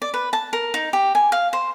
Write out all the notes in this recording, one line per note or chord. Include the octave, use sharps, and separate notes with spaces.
D5
B4
A5
A#4
D#4
G4
G#5
F5
C5